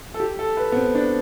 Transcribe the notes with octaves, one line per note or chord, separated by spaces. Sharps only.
A4
G4
A4
B4
B3
C4
D4